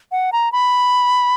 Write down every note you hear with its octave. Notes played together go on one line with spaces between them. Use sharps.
F#5
A#5
B5